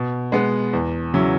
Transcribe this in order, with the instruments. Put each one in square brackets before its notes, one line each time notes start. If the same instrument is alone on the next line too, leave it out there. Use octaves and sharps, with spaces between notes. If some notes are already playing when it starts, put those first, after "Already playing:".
Already playing: [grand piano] B2
G#3 B3
E2
C#3 F#3 C#4 E4